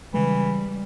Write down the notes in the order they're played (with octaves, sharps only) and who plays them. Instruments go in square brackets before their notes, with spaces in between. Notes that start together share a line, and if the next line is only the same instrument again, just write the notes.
[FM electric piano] C#3 G#3 [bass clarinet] E3 [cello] G3